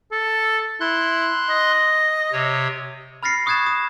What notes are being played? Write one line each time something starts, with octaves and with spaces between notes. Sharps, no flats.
A4
E4 C6 F#6
D#5
C3 C#5
B5 F6 A6 A#6 C7 C#7
C#6 D#6 F#6 G#6 A6 E7
D#6